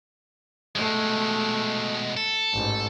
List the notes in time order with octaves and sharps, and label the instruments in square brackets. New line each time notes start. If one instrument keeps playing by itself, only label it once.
[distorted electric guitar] B2 G#3 [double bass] A3
[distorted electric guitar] A4
[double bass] A1 G#2